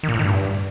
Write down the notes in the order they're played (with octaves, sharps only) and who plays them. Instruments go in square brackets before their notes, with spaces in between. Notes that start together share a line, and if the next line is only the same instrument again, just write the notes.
[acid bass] D#3
A#2
A2
D#3
G2